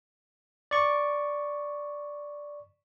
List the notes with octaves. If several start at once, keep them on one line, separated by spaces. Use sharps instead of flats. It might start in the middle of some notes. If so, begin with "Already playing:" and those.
D5 C#6